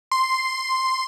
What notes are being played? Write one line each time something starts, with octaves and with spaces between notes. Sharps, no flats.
C6